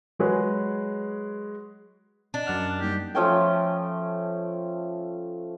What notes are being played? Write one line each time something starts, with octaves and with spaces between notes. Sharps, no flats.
F#3 G#3 F#4 G#4 B4 C#5
D4 D#5
F#2 D5 F#5 F6
G3 A#3 D#4 G4
F3 A3 C#4 G5